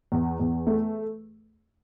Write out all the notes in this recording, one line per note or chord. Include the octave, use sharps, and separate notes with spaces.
E2
E2
A3